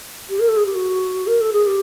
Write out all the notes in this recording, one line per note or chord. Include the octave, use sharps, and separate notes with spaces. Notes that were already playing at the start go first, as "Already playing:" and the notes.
G4
A#4
A4
G#4
G4
F#4
A#4
A4
G#4
G4